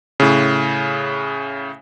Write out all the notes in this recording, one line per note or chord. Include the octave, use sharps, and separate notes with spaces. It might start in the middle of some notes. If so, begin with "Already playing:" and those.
A2 C#3